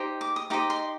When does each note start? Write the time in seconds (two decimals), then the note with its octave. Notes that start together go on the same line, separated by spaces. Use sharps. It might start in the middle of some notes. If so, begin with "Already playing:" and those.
Already playing: D#4 G4 C5
0.21 D6
0.36 D#6
0.50 D#4 G4 C5 D#5 D6
0.70 C6